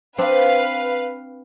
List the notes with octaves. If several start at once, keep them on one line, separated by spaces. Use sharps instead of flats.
C4 D4 B4 F5